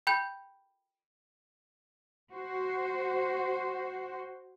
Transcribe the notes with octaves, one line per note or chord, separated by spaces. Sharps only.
G5 B5 G6
F#4 C5